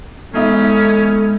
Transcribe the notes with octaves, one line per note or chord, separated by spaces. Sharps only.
E2 G#3 B3 C#4 D#4 A4 E5